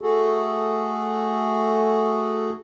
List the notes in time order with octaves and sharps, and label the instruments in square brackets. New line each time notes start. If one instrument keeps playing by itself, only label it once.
[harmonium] A3 F#4 G#4 A4